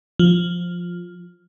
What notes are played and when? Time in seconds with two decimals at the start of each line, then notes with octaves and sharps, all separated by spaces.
0.19 F3